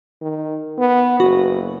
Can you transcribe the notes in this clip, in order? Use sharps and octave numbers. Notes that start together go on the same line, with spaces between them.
D#3
B3
F#1 F#4